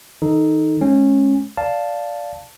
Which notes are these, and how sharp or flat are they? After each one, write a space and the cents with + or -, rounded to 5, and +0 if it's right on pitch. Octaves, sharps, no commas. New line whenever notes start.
D#3 +30 D#4 +0 A4 +0
G#3 +30 C#4 -15
D5 -10 F5 +0 A5 +0